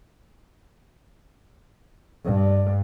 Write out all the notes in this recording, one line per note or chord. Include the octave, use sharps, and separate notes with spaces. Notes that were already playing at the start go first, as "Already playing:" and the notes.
G2